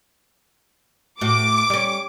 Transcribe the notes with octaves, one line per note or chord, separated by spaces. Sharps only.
A2 F#4 D6
G3 C#4